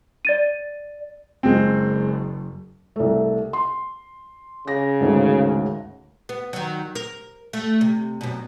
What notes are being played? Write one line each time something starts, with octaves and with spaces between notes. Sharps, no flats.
D5 A6 D#7
F#1 G#3 C4
C2 A3
C6
C#3 A#6
D2 G#2 D#3
B3
D#3 F#3
A#4
A3
C3
F#2 B2